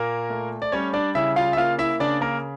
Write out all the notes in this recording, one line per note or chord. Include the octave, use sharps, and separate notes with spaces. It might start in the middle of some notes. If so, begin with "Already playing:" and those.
Already playing: A#2 A#3 A#4
A3
D5
G3 C#4 C#5
D4 D5
C#3 E4 E5
F4 F5
E5
A#3 F4 F5
E4 E5
C#3 D4 D5
A#3 A#4